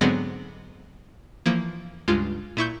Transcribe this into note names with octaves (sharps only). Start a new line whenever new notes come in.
G#2 D3 F#3 G#3 B3 C4
E3 F3 A#3
C#2 G2 G#3 F4
A#2 E4 C#6 G6